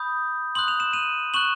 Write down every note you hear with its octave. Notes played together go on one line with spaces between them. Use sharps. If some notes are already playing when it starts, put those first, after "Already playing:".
Already playing: B5 D#6 G6
C6 D#6 F#6 F#7
F7
E7
D#7 F7
C#6 F#6 E7 F#7